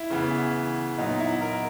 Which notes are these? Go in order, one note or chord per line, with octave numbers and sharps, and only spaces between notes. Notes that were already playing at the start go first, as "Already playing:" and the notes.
Already playing: E4
C#3 E3 B3
A#2 F#3 B3 D#4
E4
A#4